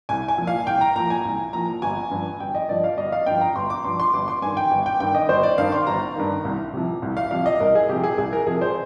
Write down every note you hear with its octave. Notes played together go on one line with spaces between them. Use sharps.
C2 G#5
G#5
A#2 F3
F5
C2 G5
A#5
A#2 F3 A#5
G#5
C2
A#2 F3 A#5
G1 G#5
G2 F3
G1 G5
D#5
G2 F3 D5
F5
G1 D#5
F5
G2 F3 G5
A#5
G1 C6
D6
G2 F3 C6
C6
G1 D6
C6
G2 D#3 G#5
G5
G1
G5
G2 D#3 G5
D#5
G1 C5
D5
G2 D#3 F5
C6
G1 A#5
G2 D#3
C2
C3 F3
C2
F5
C3 F3 F5
D#5
C2 A#4
G#4
C3 F3 G4
G#4
C2 G#4
A#4
C3 F3 G#4
C5